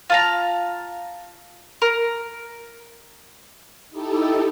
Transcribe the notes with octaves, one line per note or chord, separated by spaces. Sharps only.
F4 A5 A#5
A#4
D#4 E4 G4 A4